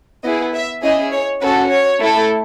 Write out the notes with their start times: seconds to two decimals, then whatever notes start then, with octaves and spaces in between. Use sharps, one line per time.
0.24 B3 E4 G#4 D#5
0.53 E5
0.83 C#4 E4 G#4 D#5
1.12 C#5
1.41 C#4 F#4 A4 B4
1.71 C#5
2.00 A3 E4 A4